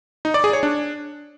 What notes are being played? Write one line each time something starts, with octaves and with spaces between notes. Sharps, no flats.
D#4
D5
G#4
C#5
D4